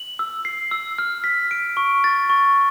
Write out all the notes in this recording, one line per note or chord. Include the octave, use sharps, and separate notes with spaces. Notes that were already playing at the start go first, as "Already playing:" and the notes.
Already playing: F#7
E6
C7
E6
F6
B6
D7
C#6
A6
C#6